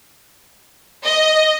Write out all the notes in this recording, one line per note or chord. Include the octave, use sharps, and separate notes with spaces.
D#5